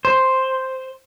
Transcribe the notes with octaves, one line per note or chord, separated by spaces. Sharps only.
C5